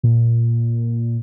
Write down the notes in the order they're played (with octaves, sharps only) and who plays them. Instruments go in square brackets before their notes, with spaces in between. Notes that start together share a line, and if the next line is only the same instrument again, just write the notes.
[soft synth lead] A#2